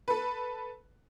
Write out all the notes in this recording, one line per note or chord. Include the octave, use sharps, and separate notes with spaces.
A4 B4